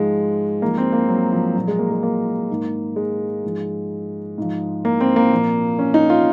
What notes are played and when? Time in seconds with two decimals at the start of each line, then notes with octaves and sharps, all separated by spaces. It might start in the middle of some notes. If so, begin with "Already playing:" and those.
Already playing: G#2 F3 G#3
0.62 G#2 F3 A#3
0.78 C4
0.93 A#3
1.09 F#3
1.32 F3
1.56 A#2 F3 F#3
1.68 G#3
1.79 A#3
1.91 G#3
2.03 A#3
2.50 G#2 D#3
2.96 G#3
3.44 G#2 F3
4.38 G#2 F3
4.85 A#3
5.00 C4
5.16 A#3
5.32 A#2 F3
5.79 C#4
5.94 D#4
6.10 F4